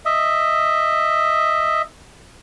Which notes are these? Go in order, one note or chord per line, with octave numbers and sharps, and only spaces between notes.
D#5 E5